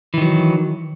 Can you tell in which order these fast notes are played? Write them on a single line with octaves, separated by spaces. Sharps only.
E3 D#3 F#3